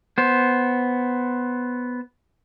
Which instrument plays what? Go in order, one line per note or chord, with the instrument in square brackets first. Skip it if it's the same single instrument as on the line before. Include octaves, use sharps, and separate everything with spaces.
[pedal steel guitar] B3 C5